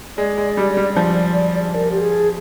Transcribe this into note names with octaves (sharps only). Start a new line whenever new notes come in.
G#3 D5
G#3
G3
G3
F3
A#4
G4
G#4